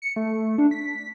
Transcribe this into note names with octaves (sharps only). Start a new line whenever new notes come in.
C#7
A3
D4
B6